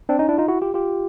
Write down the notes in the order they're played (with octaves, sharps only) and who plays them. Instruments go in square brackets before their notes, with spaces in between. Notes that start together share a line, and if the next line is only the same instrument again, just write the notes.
[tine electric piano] C4 D4
C#4 D#4
D4 E4
D#4 F4
E4 F#4
F4 G4
F4 G4